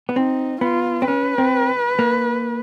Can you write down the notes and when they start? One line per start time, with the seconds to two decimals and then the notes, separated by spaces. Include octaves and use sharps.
0.09 B3
0.16 C4 D#4
0.61 B3 F4
1.02 C4
1.08 C#4 B4
1.38 C4
1.99 A#3